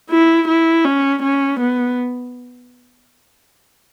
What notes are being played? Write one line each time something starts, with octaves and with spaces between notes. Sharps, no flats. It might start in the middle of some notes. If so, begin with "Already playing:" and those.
E4
E4
C#4
C#4
B3